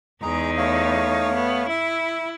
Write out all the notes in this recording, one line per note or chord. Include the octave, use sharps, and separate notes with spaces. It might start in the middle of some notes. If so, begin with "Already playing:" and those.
E2 G#3 D#4 D#5 A#5
A3 C#5 F5
B3
E4 E5